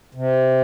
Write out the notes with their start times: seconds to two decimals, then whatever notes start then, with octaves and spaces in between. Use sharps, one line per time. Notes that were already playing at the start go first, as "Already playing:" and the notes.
0.15 C3